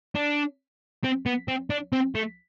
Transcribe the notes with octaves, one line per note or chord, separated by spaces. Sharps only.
D4
C4
B3
C4
D4
C4
A3